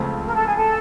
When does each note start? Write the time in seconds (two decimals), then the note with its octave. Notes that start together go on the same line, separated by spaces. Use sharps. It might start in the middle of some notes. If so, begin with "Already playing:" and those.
Already playing: C#2 C#3 F3 A3 C4
0.27 A#4
0.36 A4
0.47 G#4
0.57 A4